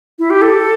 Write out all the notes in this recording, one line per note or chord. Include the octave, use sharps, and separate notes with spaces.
E4
G4
A4